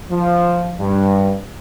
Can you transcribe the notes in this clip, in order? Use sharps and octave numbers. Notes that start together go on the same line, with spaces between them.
F3
G2